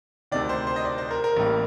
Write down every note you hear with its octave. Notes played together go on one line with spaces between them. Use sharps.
D2 C3 D#3 D5
C5
C5
D#5
D5
C5
A#4
A#4
A1 A2 G3 A#3